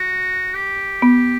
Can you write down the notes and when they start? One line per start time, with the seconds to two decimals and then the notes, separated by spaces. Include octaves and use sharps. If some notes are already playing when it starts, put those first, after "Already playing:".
Already playing: F#4
0.55 G4
1.02 B3